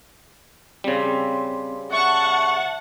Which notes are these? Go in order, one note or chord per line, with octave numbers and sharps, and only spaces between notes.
C#3 G3 C4
E5 F#5 A5 C#6